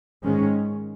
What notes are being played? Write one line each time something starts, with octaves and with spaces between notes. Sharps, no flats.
G#2 D#3 G#3 C#4